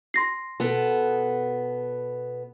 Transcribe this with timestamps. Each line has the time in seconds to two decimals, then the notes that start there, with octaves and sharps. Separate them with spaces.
0.14 C6 A#6 C7
0.60 B2 B3 A4